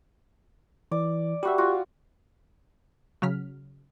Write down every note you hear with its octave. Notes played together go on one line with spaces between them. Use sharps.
E3 D5
G3 F#4 G4 E5
F4 F#4
C#3 F#3 F6 B6